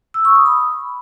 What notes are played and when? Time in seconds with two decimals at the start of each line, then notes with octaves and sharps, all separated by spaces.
0.14 E6
0.25 C#6
0.35 D#6
0.46 B5